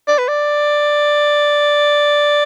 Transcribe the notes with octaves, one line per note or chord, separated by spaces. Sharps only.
D5
B4
D5